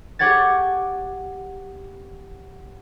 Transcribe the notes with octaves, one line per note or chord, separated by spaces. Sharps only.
G4 C#5 F#5 G#6 A6